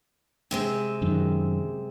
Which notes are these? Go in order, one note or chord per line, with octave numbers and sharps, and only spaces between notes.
C3 G#3 C4
F#2 D#3